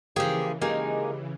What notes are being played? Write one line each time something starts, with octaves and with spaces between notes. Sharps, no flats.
C#3 E3 F3 A#3 G4 G#4 G5
G#3 A#3 D#4 G4 G#5